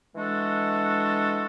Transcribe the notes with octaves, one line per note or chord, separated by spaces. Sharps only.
E3 G#3 D4 F#4 A4